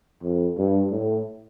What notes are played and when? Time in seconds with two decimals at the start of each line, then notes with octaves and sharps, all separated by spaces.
0.23 F2
0.57 G2
0.92 A2